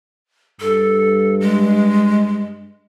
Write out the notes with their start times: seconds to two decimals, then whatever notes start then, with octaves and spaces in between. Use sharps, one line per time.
0.61 G2 A4
1.40 G#3